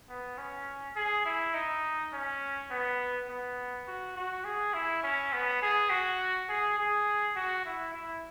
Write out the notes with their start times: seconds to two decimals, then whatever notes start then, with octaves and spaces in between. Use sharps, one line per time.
0.09 B3
0.38 C#4
0.96 G#4
1.25 E4
1.54 D#4
2.13 C#4
2.70 B3
3.29 B3
3.88 F#4
4.17 F#4
4.45 G#4
4.74 E4
5.03 C#4
5.33 B3
5.62 G#4
5.90 F#4
6.49 G#4
6.78 G#4
7.36 F#4
7.66 E4
7.94 E4